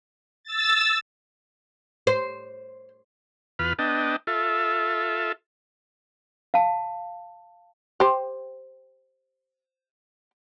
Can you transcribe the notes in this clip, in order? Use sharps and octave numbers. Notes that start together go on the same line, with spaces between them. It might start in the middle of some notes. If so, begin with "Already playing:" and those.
E6 A6
C5
E2 F4 B4 B5 F6
B3 D4 D#5 G5 A5
F4 A4 E5
F5 A5
G4 C5